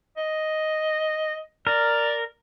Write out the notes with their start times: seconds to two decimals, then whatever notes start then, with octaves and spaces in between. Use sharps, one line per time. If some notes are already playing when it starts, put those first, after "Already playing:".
0.17 D#5
1.67 A#4 D5